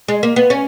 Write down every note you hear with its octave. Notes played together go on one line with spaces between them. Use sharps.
G#3
A#3
B3
C#4